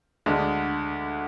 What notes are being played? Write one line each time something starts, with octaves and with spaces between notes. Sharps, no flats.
D2 D3 G#3